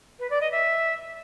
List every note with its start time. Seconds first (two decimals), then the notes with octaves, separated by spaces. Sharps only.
0.19 B4
0.30 D5
0.41 D#5
0.51 E5